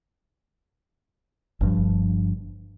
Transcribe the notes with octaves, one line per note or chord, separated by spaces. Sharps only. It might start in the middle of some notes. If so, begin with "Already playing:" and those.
G1 G2 F3